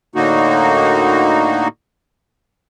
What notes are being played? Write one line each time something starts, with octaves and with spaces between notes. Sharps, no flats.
A2 D3 A#3 D#4 F#4